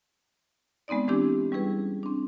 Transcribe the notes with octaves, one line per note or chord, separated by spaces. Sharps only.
G#3 B3 C4 D#4 D5
E3 G#3 C4 D4 E4 G4
G3 C#4 E4 G#4 B4
C4 D4